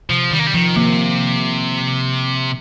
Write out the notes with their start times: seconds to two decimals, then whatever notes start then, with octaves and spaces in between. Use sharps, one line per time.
0.09 C3 F3
0.31 D#3 G3
0.39 A#3
0.47 G3
0.54 D#3 F3
0.76 C3 A#3